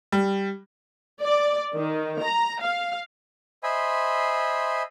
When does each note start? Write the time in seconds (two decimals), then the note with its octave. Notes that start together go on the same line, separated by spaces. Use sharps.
0.12 G3
1.20 D5
1.75 D#3
2.21 A#5
2.61 F5
3.63 C5 D#5 E5 G#5 B5 C6